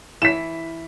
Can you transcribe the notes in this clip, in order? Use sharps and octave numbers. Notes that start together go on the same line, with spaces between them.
E3 B6 E7